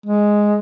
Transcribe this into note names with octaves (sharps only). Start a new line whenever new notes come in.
G#3